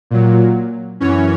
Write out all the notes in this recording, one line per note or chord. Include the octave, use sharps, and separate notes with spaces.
A#2 F#3
F#2 E3 C#4 C#5